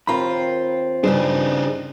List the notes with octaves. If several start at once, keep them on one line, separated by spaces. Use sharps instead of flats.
D#2 C4 F4 A#4 A#5 B5
G2 C#3 D4 D#4 G#4 C5